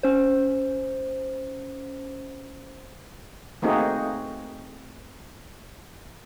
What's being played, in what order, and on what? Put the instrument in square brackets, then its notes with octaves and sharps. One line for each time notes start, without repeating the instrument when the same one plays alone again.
[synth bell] C#4 C5
[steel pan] A3 A#3 C4 D#4 F#4 G#4